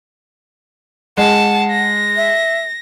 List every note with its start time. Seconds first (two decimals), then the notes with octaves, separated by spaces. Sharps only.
1.17 G#3 F#5 A5
1.71 A#6
2.16 E5